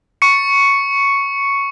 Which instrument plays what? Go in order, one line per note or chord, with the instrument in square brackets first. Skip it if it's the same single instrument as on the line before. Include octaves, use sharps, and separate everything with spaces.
[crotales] C#6 C#7